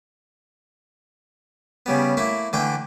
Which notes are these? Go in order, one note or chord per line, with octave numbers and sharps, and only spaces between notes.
C#3 G3 B3
A3 A#3 E4
D3 E3 A3 G5